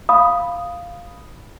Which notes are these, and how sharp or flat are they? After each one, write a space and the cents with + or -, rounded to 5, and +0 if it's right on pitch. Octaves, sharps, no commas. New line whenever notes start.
F5 +0 B5 +0 D#6 +0